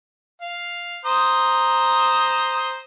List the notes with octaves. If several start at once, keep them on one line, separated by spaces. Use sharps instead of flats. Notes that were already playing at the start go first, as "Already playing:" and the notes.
F5
C5 A#5 D#6